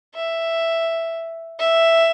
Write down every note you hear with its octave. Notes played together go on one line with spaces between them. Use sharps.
E5
E5